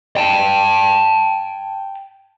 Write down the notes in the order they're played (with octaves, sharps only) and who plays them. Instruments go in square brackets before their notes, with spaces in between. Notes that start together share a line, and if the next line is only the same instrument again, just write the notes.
[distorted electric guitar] G5 A5